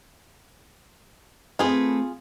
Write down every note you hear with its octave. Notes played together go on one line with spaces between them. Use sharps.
A3 C4 F4 G#4 B4